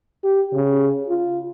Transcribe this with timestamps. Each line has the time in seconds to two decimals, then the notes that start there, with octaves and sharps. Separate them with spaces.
0.24 G4
0.53 C#3
1.08 F4